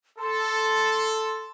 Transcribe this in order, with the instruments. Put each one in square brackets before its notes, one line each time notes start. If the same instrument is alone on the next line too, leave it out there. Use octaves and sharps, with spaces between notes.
[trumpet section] A4 [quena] C6